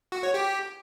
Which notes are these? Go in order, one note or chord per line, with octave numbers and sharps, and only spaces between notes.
F#4
C#5
G4